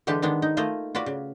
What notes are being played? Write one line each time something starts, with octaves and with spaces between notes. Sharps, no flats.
D3 E3 G#3 G4 B4 A5
D#3 G#3 B3 D4
D#4
A3 A#3 F4 C5 D#5
F4 F#4 B4 D5
C#3